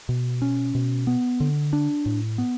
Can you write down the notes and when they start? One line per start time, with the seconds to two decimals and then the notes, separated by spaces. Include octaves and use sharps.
0.09 B2
0.42 C#4
0.75 B2
1.07 B3
1.40 D3
1.73 D4
2.06 A2
2.38 B3